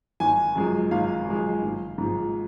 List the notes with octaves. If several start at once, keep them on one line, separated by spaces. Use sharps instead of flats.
G#1 G#5
F#2 F3 G#3
G#1 F5
F#2 F3 G#3
G#1
G#2 F3 G#3